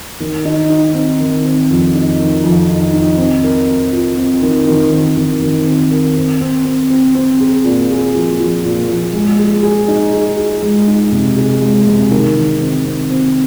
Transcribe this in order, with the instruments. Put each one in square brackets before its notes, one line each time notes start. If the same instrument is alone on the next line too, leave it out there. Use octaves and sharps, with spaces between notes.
[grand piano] D#3
D#4
D#4
C4
D#3
C4
F2
D#4
D#3
F2
D#4
D#4
C4
A#4
A#4
F4
C4
D#3
D#3
C4
D#3
D#3
C4
A#4
C4
C4
C4
C4
C4
G#4
A#2
G#4
F3
F3
A#2
F3
G#3
G#4
G#4
D#4
G#4
G#4
G#3
D#4
C3
G#4
G#3
C3
D#3
D#3
C4
C4
C4